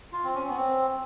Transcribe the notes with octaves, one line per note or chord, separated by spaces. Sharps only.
F4
C4
C#4
B3
C4